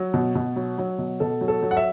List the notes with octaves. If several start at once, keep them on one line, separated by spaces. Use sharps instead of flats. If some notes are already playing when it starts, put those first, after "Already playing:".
Already playing: F#3
B2
B2
F#3
F#3
B2
B2 A4
F#3
A4
F#3
F#5
E5